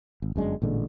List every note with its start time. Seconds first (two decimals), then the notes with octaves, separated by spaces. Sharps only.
0.22 G#1
0.36 G1 F#2 G#3 D4
0.62 A1 A#2 D3 G#3